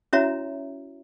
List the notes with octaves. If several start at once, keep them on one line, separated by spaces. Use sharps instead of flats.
C#4 E4 F#4 C#5 E5 A#5